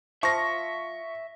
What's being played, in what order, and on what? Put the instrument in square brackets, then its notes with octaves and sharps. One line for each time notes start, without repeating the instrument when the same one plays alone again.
[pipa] F3 [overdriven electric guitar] E5 [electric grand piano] C#6 A#6